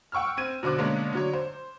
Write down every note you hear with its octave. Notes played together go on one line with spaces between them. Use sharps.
F#5 G5 C#6 E6 F6
C4 G#6 D#7
B2 D3 C5 D6 F#6
D3 G#3 A#3 B3 C#4 D4
D3 F#3 C#5
C5